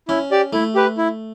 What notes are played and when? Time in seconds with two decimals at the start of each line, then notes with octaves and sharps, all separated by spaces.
0.08 C#4 E4
0.31 G4 D5
0.53 A3 E4
0.75 G4 B4
0.98 E4